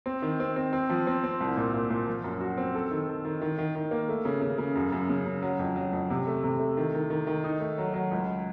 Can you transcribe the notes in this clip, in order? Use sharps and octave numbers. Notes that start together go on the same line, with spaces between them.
C4
D#3
C4
C4
C4
F3
C4
C4
C2
A#2
A#2
A#2
F3
F#2
F#4
C4
A4
D#3
A4
D#3
D#3
D#3
D#3
A#3
A3
C#3
C#3
C#3
F#2
F#2
C#3
C#3
F#3
F2
F#3
F2
C3
A3
C3
A3
D#3
D#3
D#3
D#3
D#4
A3
F#3
F#3
C#2